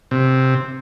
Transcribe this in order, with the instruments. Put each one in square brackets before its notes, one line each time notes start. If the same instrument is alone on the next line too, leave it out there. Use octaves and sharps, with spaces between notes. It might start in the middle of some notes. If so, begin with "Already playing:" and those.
[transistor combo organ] C3